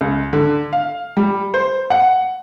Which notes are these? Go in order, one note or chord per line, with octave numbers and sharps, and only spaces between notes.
C#2
D3
F5
G3
C5
F#5